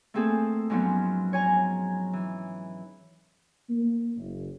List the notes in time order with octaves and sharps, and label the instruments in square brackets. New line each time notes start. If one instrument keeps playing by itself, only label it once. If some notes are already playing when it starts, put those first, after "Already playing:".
[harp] A3 A#3 C4 G#4 A4
G#2 F3 F#3 B3 C#4
C#5 G#5 A#5
E3
[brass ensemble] A#3
F#1